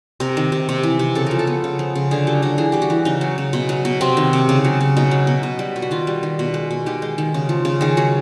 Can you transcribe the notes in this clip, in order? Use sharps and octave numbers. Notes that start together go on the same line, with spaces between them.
C3 A#4
D#3
C3
C3
E3
C3
C#3 A4
F3 A#4
A4
B3
C#3
F3
C#3
D3 G#4
F#3 G4
D3 F#4
E3 G#4
G3 G4
F#4
E3
C#3 D#4
F#3
C#3
B2
F#3
B2
C3 C4
D#3
C3
C#3
F#3
C#3
B2 D#4
F#3
B2
B2
G3
B2
F#4
D#3 F4
G3
D#3
B2
G#3
B2
D#3 G4
G#3
D#3
C#3
F3
C#3
D#3 G#4
F#3 F#4